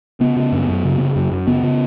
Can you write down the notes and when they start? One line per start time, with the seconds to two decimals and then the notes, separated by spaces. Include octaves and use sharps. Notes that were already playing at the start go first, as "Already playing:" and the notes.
0.20 C#3 B3
0.37 C#3
0.52 F#2
0.68 F#2
0.84 C#3
1.00 C#3
1.16 F#2
1.31 F#2
1.47 C#3 B3
1.63 C#3